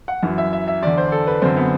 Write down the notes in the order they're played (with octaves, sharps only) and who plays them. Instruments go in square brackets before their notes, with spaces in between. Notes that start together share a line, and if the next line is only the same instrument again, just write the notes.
[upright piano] F#5
F#2 E3
E5
E5
E5
E2 D3 D5
C5
A4
B4
F#2 D3 C4
B3